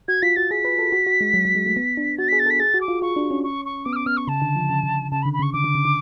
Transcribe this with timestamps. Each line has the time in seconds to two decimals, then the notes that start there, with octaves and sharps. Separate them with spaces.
0.08 F#4 G#6
0.22 F4 B6
0.36 F#4 A6
0.51 G#4 B6
0.65 B4
0.79 A4
0.92 F#4
1.07 F#4
1.21 G#3
1.34 F#3
1.45 F#3
1.55 G#3
1.66 A3
1.76 B3
1.97 D4
2.18 F#4 A6
2.28 G#4 B6
2.39 A6
2.46 A4 B6
2.60 G#4 A6
2.74 F#4
2.81 D6
2.88 F4
3.02 F4 C#6
3.16 D4
3.31 C#4
3.44 C#6
3.65 C#6
3.85 B3 D6
3.93 F6
3.96 D6
4.06 B3 F6
4.17 C#6
4.27 C#3 A5
4.42 D3
4.55 F3
4.69 C#3
4.83 C#3
5.11 C#3 A5
5.22 B5
5.25 D3
5.33 B5
5.39 C#3 C#6
5.53 D3 D6
5.64 D3
5.75 C#3
5.85 D3